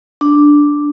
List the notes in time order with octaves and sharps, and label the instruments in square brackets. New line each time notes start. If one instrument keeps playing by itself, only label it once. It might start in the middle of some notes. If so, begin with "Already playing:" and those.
[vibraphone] D4